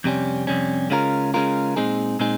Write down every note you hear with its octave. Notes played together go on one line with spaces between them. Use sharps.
F2 C3 G3 C#4
F2 C3 G3 C#4
C#3 G#3 C#4 F4 A#4
C#3 G#3 C#4 F4 A#4
A#2 G#3 C4 D#4 G#4
A#2 G#3 C4 D#4 G#4